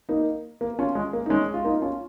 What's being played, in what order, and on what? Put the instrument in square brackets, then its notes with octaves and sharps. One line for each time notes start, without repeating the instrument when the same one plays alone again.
[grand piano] A#3 D#4
A#3
C#4 F4
G#3
A#3
D#4
G#3 C#4
F4
A#3 D#4
C#4 F4